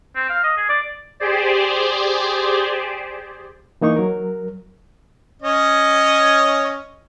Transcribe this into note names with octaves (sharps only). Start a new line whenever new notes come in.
C4
F5
D#5
G#4
D5
G4 G#4 C5 D5
E3 A#3 D#4 C#6
F#3 A#4
C#4 C#5 D#5